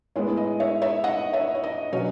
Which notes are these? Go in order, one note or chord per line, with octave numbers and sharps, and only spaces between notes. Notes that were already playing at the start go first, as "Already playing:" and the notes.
A2 G#3 B3 C#5
D#5
C#5 E5
C#5 E5
D#5 F#5
C#5 E5
C#5
D#5
B2 F#3 C#4 C#5